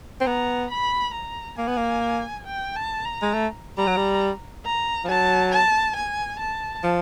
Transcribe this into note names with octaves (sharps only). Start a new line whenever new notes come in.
C4
B3 A#5
B5
A#5
A#3 G#5
B3
A#3
G5
A5
A#5
G#3
A3
G3 A#5
F#3
G3
A#5
F3
F#3 A5
A5
G#5
A5
F3